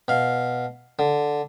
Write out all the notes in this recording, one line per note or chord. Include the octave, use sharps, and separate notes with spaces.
B2 F5
D3